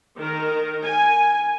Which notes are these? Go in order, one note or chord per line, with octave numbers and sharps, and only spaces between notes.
D#3 A#4
G#5